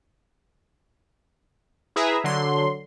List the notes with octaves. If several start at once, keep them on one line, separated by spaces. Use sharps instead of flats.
E4 G#4 B4 E5 A#5
D3 F#3 C6